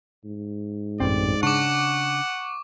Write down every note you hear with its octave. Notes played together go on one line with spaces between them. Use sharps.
G#2
A1 F#2 C4 D5
C#3 D4 F#5 C#6 D6